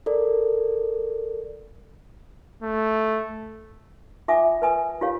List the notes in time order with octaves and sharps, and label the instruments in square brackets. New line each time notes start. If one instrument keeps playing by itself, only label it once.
[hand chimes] A4 A#4 D5
[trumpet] A3
[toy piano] F4 E5 F#5 G#5 D6 D#6
B4 G#5 D#6
F4 G4 C#5 F5